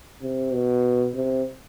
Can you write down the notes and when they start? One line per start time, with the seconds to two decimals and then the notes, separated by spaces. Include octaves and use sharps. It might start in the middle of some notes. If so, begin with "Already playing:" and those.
0.22 C3
0.53 B2
1.15 C3